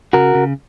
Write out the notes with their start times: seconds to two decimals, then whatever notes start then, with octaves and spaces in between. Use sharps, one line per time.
0.13 C#3 F#4 A#4
0.35 C#3